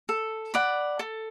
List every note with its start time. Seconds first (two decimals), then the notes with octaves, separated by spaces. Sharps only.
0.09 A4
0.54 D5 F#5 B5
0.99 A4